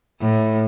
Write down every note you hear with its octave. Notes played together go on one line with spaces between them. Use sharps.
A2